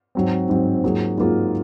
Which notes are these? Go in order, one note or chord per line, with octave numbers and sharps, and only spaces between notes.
G#2 F#3 C4
G#2 F#3 C4
G#2 F#3 A#3 F4 G#4
G#2 F#3 A#3 F4 G#4